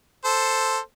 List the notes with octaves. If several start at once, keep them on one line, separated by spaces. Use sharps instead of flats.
A4 C5